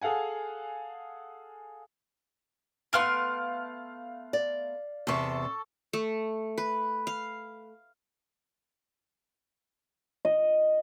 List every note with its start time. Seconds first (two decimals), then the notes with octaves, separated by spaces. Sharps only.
0.02 G#4 A4 F5 F#5 G#5
2.93 A3 B3 F5 C6 F6 D7
4.33 D5
5.07 E2 C3 A4 C#6
5.93 A3
6.58 B4
7.07 F5
10.25 D#5